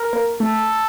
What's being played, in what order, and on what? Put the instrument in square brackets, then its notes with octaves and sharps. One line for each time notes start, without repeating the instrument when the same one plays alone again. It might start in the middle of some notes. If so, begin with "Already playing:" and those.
Already playing: [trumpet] A#4
[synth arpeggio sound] A#3
[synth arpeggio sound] A3 [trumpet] A4